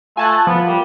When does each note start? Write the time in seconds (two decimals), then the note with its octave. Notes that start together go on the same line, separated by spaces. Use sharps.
0.17 A3 F4 G#5 A5 F#6
0.47 F3 B3
0.67 G3 A#3